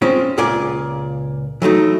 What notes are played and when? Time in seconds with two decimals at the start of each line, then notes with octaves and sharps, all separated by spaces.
0.02 G#3 C4 C#4 F4
0.38 C#2 A#2 F4 G#4 D5 G#5
1.62 E3 F#3 A3 D#4